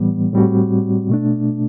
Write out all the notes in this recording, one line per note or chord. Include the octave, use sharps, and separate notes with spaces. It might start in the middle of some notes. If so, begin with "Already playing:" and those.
Already playing: A2 E3 G3 B3
A2 G3 C4 F#4
B2 A3 D4